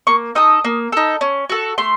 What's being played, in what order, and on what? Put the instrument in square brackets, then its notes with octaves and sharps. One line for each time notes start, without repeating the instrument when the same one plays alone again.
[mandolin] A#3 C#6
D#4 A4 D#6
A#3
D#4 A4
C#4
F#4 A4
A3 C6